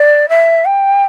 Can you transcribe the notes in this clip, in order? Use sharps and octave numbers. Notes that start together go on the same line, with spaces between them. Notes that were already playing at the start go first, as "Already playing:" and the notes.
Already playing: D5
E5
G5